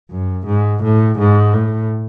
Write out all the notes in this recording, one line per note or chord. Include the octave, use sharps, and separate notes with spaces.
F#2
G#2
A2
G#2
A2